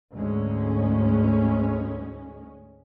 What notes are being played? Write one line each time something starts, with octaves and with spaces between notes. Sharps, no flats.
D2 G#2 G#3 C#4